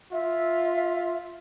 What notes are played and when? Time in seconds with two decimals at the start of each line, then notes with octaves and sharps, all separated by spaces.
0.13 F4 E5